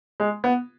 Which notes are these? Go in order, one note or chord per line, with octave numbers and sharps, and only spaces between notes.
G#3
B3